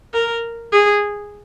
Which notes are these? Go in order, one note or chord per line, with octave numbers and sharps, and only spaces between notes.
A#4
G#4